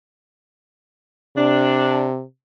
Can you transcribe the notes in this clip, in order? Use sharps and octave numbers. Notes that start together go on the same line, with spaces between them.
C3 D4